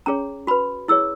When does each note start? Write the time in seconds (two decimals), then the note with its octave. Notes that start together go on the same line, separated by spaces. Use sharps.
0.06 C#4 G#4 C#5 A#5
0.47 F#4 B4 B5
0.88 E4 G#4 C#5 E6